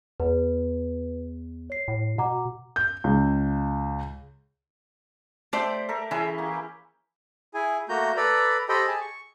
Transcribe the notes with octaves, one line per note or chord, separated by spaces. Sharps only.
E2 B4
C#5 C7
A2
B2 F#5 A#5 D6
G6
C#2
A3 G4 C5 D5
A4 A#4 E5
E3 C#4 E4 G#4
A#3 G4
E4 G#4 G#5
A3 A#3 F#4 A#5 G6
A4 B4 D5 A#5 B5
G4 A4 C5 D#5 G5 B5
G#4 G#5 A5
C#6